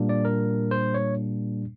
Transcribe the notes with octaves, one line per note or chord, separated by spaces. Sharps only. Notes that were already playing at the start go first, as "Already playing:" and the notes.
Already playing: A#2 G3 A#3 D4
D5
A#4
C5
C#5